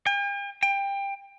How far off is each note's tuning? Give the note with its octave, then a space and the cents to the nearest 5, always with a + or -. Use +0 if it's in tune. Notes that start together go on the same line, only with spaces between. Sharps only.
G5 +45
G5 +20